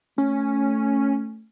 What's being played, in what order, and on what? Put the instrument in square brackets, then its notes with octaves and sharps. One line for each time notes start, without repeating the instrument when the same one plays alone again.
[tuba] A3 [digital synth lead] C#4